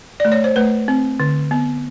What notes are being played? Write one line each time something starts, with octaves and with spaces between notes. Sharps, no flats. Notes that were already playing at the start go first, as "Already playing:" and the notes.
A3 D5
C#5
C5
A3 B4
C4
D3
B3